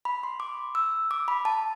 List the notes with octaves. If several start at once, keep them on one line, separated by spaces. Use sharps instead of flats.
B5
C6
D6
E6
D6
B5
A5